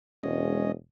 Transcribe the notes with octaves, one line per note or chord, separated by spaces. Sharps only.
E1 G#3 C#4 D#5